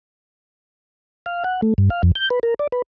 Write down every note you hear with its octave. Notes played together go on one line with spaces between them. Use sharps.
F5
F#5
A3
G2
F5
F2
G6
B4
A#4
D5
B4